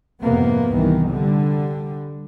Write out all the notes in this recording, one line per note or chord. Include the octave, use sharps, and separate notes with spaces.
F2 G#2 C3 A#3 B3
C2 D#3 E3
D3 G3